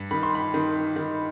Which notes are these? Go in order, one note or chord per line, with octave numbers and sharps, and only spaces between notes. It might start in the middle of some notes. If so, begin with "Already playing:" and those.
Already playing: G2
D#3 B5
C6
B5
D#3
D#3